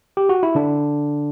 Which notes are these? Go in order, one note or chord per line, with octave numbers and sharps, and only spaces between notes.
G4
F#4
E4
D3 D4